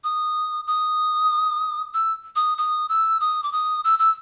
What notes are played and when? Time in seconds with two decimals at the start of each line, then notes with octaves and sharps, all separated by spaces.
0.04 D#6
0.67 D#6
1.94 E6
2.36 D#6
2.58 D#6
2.89 E6
3.21 D#6
3.43 D6
3.52 D#6
3.84 E6
3.99 E6